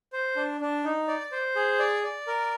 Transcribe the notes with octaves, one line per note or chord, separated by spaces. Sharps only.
C5
D4
D4
D#4
D5
C5
G#4
D5
D5
A#4